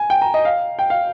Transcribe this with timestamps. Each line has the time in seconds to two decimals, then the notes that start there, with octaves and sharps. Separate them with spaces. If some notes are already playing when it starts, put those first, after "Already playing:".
Already playing: G#5
0.10 G5
0.22 A#5
0.34 D#5
0.45 F5
0.79 G5
0.90 F5